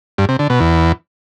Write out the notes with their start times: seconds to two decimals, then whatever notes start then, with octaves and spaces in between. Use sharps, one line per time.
0.18 G2
0.29 C3
0.39 D3
0.50 B2
0.60 E2